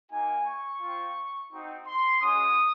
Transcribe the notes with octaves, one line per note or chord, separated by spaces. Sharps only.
A#3 D#4 F#4 G#5
C#6
C4 F4
C4 D#4 F#4
C6
G#3 C#4 F#4 D#6